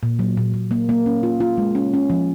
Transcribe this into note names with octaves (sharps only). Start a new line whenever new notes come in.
A#2
F#3
A#2
A#2
A#3
A#3
C#4
F4
F4
G#3
C#4
C#4
F3